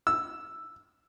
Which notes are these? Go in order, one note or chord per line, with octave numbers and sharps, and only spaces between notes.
E6